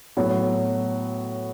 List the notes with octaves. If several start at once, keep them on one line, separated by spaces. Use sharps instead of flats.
A2 F#3 B3